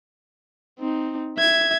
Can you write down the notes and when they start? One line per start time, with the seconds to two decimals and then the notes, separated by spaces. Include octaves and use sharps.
0.79 C4 D#4
1.38 E5 G#6